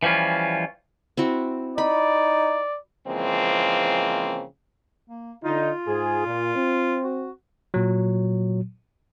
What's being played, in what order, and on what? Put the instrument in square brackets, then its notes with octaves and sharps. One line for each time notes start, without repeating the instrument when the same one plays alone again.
[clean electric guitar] E3 F3 G3 C#4 F4
[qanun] C4 E4 F#4
[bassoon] D#4 [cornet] D5 [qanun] B5
[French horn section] C#3 E3 F3 G#3 A#3 C4
[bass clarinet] A#3
[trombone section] D3 D#4 [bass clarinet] F4
[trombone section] G#2 G#4
A#2
C4
[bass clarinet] F#4
[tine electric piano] A#2 F#3